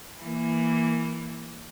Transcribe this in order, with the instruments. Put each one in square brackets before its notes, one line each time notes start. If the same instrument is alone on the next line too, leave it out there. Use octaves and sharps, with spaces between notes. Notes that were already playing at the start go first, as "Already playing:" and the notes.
[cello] E3 A#3